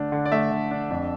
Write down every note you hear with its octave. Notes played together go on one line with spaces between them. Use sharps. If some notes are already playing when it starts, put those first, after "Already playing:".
Already playing: D3 A3 D4
D3
D5
A3 E5
D3
D4
F2